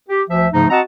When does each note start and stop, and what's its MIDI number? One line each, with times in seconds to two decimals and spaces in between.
0.08 0.22 67
0.29 0.47 38
0.29 0.47 53
0.29 0.47 76
0.53 0.65 44
0.53 0.65 49
0.53 0.65 53
0.53 0.65 57
0.53 0.65 63
0.70 0.80 60
0.70 0.80 66
0.70 0.80 75
0.70 0.80 78
0.70 0.80 81
0.70 0.80 82